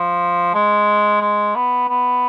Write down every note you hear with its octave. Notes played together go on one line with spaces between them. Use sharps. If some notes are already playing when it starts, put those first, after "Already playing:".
Already playing: F3
G#3
G#3
B3
B3